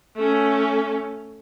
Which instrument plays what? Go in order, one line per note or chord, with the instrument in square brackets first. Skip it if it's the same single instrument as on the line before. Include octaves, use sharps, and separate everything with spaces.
[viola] A3 C#4